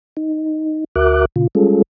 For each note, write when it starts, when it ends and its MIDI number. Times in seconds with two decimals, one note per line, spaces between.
0.17 0.84 63
0.96 1.25 38
0.96 1.25 66
0.96 1.25 70
0.96 1.25 76
0.96 1.25 86
0.96 1.25 90
1.36 1.47 46
1.36 1.47 49
1.36 1.47 65
1.55 1.82 55
1.55 1.82 56
1.55 1.82 61
1.55 1.82 65
1.55 1.82 68
1.55 1.82 69